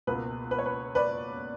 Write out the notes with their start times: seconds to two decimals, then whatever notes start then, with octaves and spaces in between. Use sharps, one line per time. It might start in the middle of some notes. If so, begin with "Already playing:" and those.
0.07 C#2 B2 A#3 B4
0.51 B4
0.58 C#5
0.66 B4
0.95 B4 D5